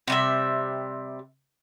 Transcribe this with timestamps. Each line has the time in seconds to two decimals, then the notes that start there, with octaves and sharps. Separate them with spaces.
0.08 C3 G3 E5